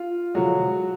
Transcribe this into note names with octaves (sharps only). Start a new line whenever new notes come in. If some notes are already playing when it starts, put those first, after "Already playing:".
Already playing: F4
D3 F3 F#3 G#3 F#4